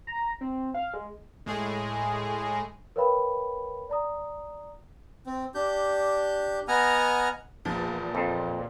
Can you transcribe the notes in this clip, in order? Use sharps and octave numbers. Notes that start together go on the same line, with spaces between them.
A#5
C4
F5
G#3
A2 G#3 G#4
A#4 B4 C#5 F5 G5 B5
D5 A#5 D#6
C4
D4 G4 G6
B3 D#5 F#5 G#5 A#5 F6
E2 A#2 F3
F2